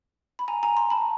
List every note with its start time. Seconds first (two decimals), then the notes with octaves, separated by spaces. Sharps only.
0.39 B5
0.48 G#5 A#5
0.63 G#5 A#5
0.77 A#5 C6
0.90 A5 B5